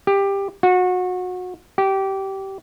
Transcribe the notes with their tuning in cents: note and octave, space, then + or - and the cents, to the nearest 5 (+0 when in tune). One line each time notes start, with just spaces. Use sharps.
G4 +15
F#4 -25
G4 -20